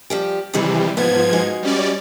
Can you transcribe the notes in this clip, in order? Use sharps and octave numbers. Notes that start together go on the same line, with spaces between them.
F3 G3 G4
C3 D#3 E3 G3 G#4 A4
G#2 F3 B3 G#6
G#3 D#4 F#4
G3 C#4 D5